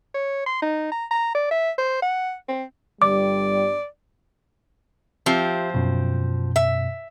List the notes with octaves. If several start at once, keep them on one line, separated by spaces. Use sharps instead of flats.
C#5
C6
D#4
A#5
A#5
D5
E5
C5
F#5
C4
G1 G2 G3 D5 D6
F3 C4 F4 G4 E5
F#2 B2
E5